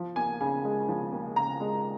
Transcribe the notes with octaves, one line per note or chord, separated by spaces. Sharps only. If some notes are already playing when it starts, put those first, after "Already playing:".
Already playing: F3
D#2 G#5
C#3 G#5
G#3
F3
D#2
C#3 A#5
G#3